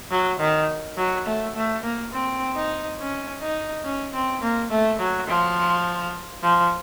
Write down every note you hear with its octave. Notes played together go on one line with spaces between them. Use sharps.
F#3
D#3
F#3
A3
A3
A#3
C4
D#4
C#4
D#4
C#4
C4
A#3
A3
F#3
F3
F3